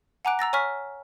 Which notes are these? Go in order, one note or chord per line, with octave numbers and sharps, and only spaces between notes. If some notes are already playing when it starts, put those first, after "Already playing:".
F#5 G#5 A#5 D6 F#6 D7
A#5 E6 A6 A#6
C#5 G#5 C#6 F6 B6